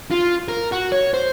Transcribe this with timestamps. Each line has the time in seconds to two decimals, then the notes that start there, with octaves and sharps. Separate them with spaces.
0.11 F4
0.48 A#4
0.72 F#4
0.92 C#5
1.14 C5